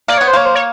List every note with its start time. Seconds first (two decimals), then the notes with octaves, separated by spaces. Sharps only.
0.08 A#3 D5
0.18 B3 C#5
0.27 C5
0.33 A#3 C#5
0.46 C5
0.55 C#5